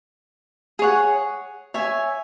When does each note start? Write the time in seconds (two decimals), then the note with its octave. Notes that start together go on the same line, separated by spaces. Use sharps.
0.79 G#4 C#5 F#5
1.74 C#5 E5 G#5